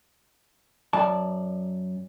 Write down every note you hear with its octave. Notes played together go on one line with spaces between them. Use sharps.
F#2 D5 A5